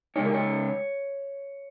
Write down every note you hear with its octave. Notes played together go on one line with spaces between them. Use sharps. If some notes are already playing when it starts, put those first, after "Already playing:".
C#3 G#3 D#4 C#5
A#4
C#5